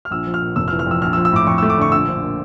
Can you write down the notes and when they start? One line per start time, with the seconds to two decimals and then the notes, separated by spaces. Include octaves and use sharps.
0.05 F6
0.11 A#1 E6
0.27 F3
0.34 F6
0.42 A#2
0.56 F1 E6
0.68 F6
0.72 E3
0.79 F6
0.87 F2 E6
1.02 A#1 F6
1.13 E6
1.17 F3
1.25 E6
1.32 A2 D6
1.47 F2 C#6
1.58 A3 E6
1.70 D6
1.78 D3 C#6
1.92 A#1 E6
2.08 F3
2.23 A#2